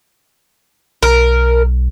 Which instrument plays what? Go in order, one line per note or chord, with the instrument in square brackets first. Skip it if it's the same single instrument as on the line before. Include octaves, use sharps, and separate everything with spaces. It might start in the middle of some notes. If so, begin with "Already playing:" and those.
[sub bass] B1 [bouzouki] A#4